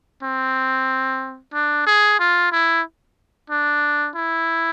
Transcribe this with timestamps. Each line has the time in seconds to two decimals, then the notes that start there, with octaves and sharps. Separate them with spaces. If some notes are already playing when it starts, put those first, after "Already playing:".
0.23 C4
1.54 D4
1.86 G#4
2.19 F4
2.52 E4
3.50 D4
4.15 E4